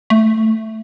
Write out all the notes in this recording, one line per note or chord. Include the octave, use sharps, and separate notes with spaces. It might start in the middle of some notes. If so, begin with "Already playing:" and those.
A3